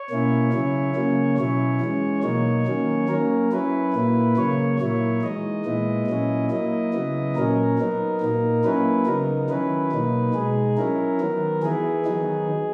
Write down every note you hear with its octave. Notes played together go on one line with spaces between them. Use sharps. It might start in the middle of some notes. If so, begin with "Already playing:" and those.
Already playing: C#5
B2 A#3 C#4 E4
C#3 F#3 C#4 E4
C#3 F#3 A#3 C#4
B2 F#3 C#4 E4 C#5
E3 G#3 C#4
B2 F#3 A#3 D#4 C#5
D#3 F#3 A#3 C#4
F#3 A#3 C#4 A#4
F#3 C#4 E4 B4
A#2 A#3 E4
C#3 F#3 A#3 C#5
A#2 F#3 A#3 E4 C#5
E3 G#3 D#4 D#5
A#2 G#3 B3 E4
A#2 F#3 C#4 E4
F#3 A#3 E4 D#5
C#3 F#3 B3 E4
A#2 F#3 C#4 A#4
F#3 B3 D#4
A#2 A#3 D#4
F#3 A#3 C#4 E4 B4
C#3 F#3 B3 D#4 A#4
D#3 F#3 C#4 E4 B4
B2 F#3 A#3 D#4
B2 G#3 D#4 G#4
F#3 C#4 E4 A#4
D#3 F#3 B3
E3 B3 E4 G#4
D#3 F#3 B3 D#4